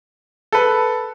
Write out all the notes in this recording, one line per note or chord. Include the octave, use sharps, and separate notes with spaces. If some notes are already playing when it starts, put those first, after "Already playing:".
A4 B4